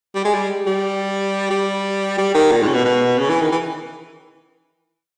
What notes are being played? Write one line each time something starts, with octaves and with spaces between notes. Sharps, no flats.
G3
G#3
G3
G3
G3
G3
D#3
A#2
G#2
C#3
B2
B2
C#3
E3
D#3
E3